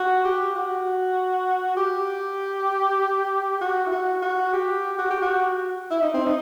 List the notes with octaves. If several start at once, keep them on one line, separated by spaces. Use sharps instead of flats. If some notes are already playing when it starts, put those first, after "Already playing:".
Already playing: F#4
G4
F#4
G4
F#4
E4
F#4
F#4
G4
F#4
G4
F#4
E4
D#4
C4
D#4